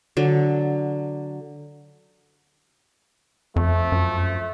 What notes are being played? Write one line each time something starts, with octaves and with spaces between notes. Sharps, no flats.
D3 F#3
F2 F3 A3
F#2